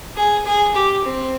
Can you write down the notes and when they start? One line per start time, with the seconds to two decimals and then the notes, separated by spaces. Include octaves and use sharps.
0.16 G#4
0.45 G#4
0.74 G4
1.04 C4